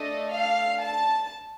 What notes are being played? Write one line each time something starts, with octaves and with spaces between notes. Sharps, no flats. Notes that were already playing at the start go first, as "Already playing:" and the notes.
Already playing: A3 D4 A4 D#5
F5
A5